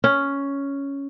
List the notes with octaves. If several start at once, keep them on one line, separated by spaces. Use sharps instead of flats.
C#4